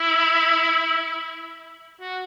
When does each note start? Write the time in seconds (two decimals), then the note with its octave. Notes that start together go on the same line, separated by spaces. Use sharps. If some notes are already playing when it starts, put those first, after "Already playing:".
Already playing: E4
2.01 F#4